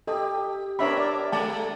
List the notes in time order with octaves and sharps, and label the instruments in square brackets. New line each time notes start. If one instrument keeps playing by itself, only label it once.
[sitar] G4 [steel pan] A4 D#5
[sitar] B3 D4 A#4 [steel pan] C#5 E5 B5
[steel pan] D5
[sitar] G#3 A3 [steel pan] A5